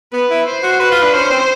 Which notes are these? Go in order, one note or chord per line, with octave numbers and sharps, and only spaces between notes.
B3 B4
E4
C5
F#4
F#4 B4
F4
D4
C#4 C5
C4